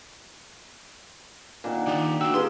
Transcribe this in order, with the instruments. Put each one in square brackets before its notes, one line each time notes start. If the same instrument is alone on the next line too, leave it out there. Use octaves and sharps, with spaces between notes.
[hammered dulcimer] A#2 D#3 F#5 [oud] D4
[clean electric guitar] D#3 D#4 F4 [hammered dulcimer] G4
[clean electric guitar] D4 F#4 [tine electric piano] G5 E6
[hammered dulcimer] F4 G#4 A#4 [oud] G4 B4 [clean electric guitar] C6